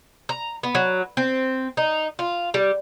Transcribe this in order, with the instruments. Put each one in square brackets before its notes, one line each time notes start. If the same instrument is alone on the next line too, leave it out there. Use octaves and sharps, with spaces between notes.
[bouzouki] A#5
B3
F#3
C4
D#4
F4
G3